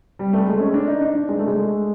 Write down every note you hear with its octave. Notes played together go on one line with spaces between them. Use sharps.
G3
A3
G#3
C#4
D4
D#4
D4
D4
G#3
A3
G#3